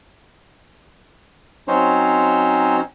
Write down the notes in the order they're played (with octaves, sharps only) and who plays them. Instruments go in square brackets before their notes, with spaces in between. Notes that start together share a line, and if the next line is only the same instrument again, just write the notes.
[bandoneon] F#3 C4 C#4 D#4 C5 C#5